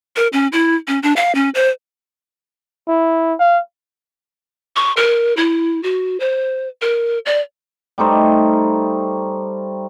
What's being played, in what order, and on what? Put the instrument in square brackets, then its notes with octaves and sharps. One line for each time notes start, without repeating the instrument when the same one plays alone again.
[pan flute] A#4
C#4
E4
C#4
D4
F5
C#4
C5
[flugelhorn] E4
F5
[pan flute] C#6
A#4
E4
F#4
C5
A#4
D5
[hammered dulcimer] G3 A3 D#4 C5